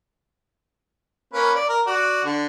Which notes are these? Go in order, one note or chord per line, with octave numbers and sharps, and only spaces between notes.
A#3 C#4 B4
D5
A#4
F#4 D5
D3